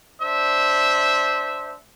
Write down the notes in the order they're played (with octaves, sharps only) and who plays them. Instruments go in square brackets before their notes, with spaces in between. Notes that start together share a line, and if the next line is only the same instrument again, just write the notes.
[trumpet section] D4 C5 E5